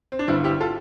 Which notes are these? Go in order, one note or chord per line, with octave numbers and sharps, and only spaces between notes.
C4
D4
G1 G2 D3 C4 E4
E4 G4
F4 A4